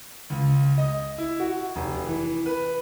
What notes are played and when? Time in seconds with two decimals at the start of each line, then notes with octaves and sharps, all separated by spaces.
0.30 C#2
0.78 D#5
1.18 E4
1.40 F#4
1.76 F1
2.06 E3
2.46 B4